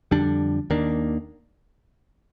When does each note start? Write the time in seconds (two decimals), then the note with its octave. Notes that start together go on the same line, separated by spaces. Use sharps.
0.11 F2 D3 G3 D4
0.70 D#2 D#3 A#3 D4